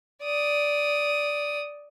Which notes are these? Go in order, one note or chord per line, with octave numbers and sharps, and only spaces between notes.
D5 D#6